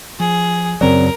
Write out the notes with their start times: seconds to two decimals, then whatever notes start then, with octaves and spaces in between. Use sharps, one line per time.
0.20 F3 G#4
0.81 F#2 C#3 F#3 C4 A#4 D5